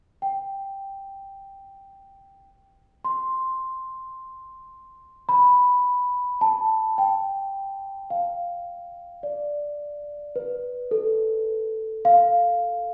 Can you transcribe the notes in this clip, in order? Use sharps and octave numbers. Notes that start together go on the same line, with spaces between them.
G5
C6
B5
A5
G5
F5
D5
B4
A4
F5